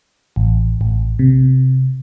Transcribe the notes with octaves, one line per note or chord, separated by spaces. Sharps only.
A1
A1
C3